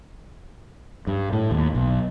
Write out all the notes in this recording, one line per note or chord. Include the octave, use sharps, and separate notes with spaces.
G2
A2
D#2
B1